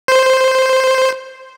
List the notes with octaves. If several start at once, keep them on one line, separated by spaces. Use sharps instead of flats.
C5